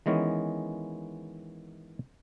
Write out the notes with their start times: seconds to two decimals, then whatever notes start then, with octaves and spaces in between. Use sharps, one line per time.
0.06 D#3 E3 G#3 B3 C#4